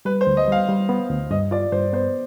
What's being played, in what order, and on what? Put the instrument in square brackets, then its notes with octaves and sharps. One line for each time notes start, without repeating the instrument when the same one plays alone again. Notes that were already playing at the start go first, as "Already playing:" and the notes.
[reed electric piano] G3 [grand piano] B4
[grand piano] C5
[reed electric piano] D2
[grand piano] D#5
[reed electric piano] G3 [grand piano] F5
[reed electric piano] G3
B3
D2
[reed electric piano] G2 [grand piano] D#5
[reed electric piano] F4 [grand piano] D5
[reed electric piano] G2 [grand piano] C5
[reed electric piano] B3 [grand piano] C5